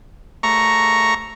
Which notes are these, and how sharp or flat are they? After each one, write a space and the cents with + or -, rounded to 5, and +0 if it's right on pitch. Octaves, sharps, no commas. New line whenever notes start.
A3 +5 A#5 +0 C#6 +0